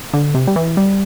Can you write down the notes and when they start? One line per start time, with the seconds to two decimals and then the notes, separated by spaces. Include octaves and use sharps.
0.14 D3
0.35 C3
0.47 G3
0.56 E3
0.77 G3